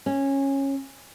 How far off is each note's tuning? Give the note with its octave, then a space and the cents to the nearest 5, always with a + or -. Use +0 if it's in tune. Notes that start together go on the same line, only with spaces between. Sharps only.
C#4 -15